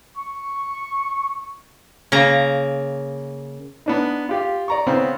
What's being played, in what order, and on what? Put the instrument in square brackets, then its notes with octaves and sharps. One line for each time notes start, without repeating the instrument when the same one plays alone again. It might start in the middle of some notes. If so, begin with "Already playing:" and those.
[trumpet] C#6
[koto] C#3 A#3 A#5
[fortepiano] B3 D4 D#4
F4 G4 F5
D5 A#5 C#6
C#3 B3 C4